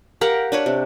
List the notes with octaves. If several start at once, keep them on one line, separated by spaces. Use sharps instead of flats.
G4 A#4 F5 F#5
D4 B4 C#5
C3